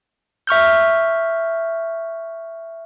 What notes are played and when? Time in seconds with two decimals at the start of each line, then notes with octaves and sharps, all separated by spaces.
0.47 E5 C#6 F6 G6